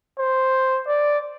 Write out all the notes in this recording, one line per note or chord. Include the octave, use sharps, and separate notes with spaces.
C5
D5